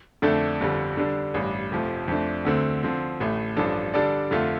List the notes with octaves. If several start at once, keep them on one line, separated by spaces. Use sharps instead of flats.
F2 D3 A3 D4 A4
G1 F2 D3 G3
D3 G3 D4
A1 G2 G3
F1 F2 F3 A3
F2 F3 A3 D4
D2 D3 A3 C4
D3 F3 C4
A1 A2 A3
A1 G2 F3 D4 A4
D3 G3 D4 A4 D5
F2 D3 A3 F4